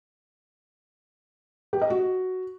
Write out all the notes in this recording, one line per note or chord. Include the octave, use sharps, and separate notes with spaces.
G4
D#5
F#4